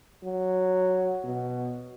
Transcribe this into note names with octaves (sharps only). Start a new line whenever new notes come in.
F#3
B2